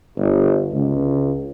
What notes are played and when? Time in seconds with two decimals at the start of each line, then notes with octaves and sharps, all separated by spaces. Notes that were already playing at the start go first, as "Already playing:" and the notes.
0.18 G1
0.72 C#2